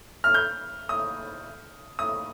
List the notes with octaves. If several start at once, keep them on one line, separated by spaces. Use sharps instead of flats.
F6
G6
D#6
D#6